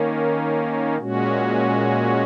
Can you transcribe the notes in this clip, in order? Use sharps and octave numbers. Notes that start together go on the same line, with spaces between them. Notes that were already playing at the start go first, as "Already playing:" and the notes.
Already playing: D#3 A#3 C#4
A#2 G#3 C#4 F#4